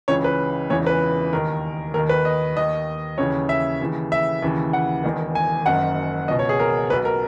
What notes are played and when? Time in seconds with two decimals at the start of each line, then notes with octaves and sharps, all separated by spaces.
0.08 C#2 C#3 E3 C#5
0.24 B4
0.70 E1 E2 C#3 E3 C#5
0.86 B4
1.33 D#2 D#3 A#4
1.94 D#2 A#4
1.99 D#3
2.09 B4
2.25 D#5
2.56 D#2 D#3 D#5
3.18 D#2 C#3 E3 C#5
3.49 E5
3.81 D#2 C#3 E3
4.12 E5
4.43 D#2 C#3 E3
4.73 F#5
5.04 E1 E2 D#3
5.35 G#5
5.66 F#1 F#2 D#3 F#5
6.28 C#2 D#5
6.31 B2
6.39 C#5
6.49 G#4
6.59 A#4
6.90 B2 B4
6.93 B1
7.05 A#4